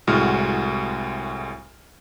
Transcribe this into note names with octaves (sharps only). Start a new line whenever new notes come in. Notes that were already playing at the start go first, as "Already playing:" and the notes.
C2 A2 G#3 F#4 F6